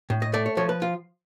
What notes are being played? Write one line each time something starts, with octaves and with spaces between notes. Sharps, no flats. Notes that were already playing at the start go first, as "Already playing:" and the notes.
A2
D#5
A3 D5
C#5
F3 C#5
B4
F4